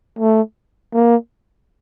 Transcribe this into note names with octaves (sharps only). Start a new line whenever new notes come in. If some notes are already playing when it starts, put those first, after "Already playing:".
A3
A#3